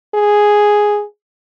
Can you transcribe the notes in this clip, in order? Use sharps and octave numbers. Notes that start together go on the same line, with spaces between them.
G#4